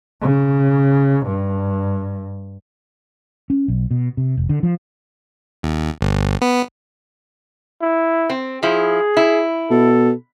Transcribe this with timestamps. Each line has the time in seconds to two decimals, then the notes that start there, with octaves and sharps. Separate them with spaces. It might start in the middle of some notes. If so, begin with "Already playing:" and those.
0.21 C#3
1.26 G2
3.50 C#4
3.68 B1
3.91 B2
4.17 C3
4.37 F1
4.49 D3
4.63 F3
5.63 D#2
6.01 G1
6.42 B3
7.81 E4
8.30 C4
8.63 F3 E4 G#4
9.17 E4
9.70 B2 A4